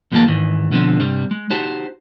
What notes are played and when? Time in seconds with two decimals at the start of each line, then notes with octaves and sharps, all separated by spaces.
0.12 D#2 B2 F3 G#3 A#3 A5
0.28 G#2 D#3 E3
0.71 B2 D3 F3 C4
1.00 G2 C3 G3
1.31 G#3
1.50 D#4 F#4 G4 C5 A5